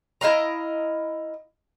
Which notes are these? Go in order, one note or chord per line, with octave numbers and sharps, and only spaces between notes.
E4 D#5 F5 A#5